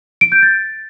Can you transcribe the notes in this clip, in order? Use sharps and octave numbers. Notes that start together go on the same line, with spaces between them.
D7
G6
A6